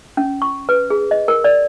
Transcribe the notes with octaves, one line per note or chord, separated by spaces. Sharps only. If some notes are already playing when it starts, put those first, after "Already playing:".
C#4
C#6
B4
G#4
D#5
A#4
D5